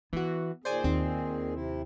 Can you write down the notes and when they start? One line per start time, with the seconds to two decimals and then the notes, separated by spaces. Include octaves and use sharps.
0.13 E3 B3 F#4
0.65 A#2 D#3 G#4 C5 D5 G#5
0.84 D#2 C4
1.54 C3 E4